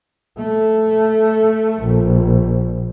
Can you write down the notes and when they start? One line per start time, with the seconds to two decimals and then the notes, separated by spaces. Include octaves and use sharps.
0.38 A3
1.82 A#1